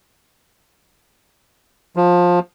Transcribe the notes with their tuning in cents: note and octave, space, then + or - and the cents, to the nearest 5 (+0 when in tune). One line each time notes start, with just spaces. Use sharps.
F3 +20